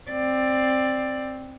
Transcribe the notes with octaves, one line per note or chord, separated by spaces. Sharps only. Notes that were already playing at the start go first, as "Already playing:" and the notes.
C4 D5